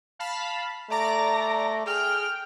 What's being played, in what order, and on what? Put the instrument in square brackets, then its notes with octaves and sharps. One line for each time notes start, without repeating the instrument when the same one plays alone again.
[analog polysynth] F5 A5 B5
[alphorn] A3 [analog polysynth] D5 D6 A#6 [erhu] A#5
[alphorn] G#4 [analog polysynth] G5 [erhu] F6